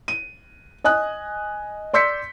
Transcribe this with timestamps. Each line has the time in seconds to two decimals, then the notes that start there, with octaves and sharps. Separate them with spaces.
0.08 D#7
0.84 D#5 G#5 D#6 F#6
1.93 D5 C6 E6 G6 B6 C#7